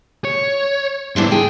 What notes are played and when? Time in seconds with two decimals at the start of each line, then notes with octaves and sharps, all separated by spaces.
0.24 C#5
1.16 G#2 B3 D4 E4 C5
1.32 G#4 G5